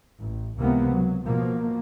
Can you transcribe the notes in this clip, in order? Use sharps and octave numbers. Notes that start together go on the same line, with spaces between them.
A1
C#2 C3 E3 A#3 B3
F#3
B2 F3 A#3